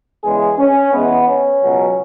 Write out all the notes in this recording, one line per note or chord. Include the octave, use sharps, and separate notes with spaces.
E2 C#3 E3 G#3 G#4
C#4
E2 E3 G#3 B3
C#4
C#2 B2 F#3